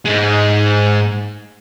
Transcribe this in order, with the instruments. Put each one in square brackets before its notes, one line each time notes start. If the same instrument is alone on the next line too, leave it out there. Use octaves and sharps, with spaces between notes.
[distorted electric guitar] G#2 G#3